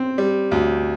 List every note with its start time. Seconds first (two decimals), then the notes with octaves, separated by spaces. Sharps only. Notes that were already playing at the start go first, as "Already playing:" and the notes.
Already playing: C4
0.18 G3
0.51 D2